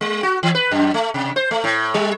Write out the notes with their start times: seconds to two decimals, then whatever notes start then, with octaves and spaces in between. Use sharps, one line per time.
0.01 G#3
0.23 F#4
0.43 E3
0.55 B4
0.71 F#2
0.94 A3
1.14 C3
1.36 C5
1.51 A3
1.64 A2
1.94 G3